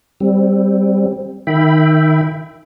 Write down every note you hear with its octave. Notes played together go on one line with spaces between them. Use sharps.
G3 C4
D#3 E5 G5 B5